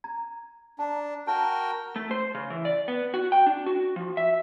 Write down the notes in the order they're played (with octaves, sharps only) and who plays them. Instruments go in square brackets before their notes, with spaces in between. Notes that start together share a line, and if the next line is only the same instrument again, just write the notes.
[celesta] A#5 G#6
[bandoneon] D4 [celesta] A5 A#5
[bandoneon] F#4 A#4 G5 [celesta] A5
[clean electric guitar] A3
C5
C#3
E3
D5
B3
F#4
G5
D4
F#4
F3
E5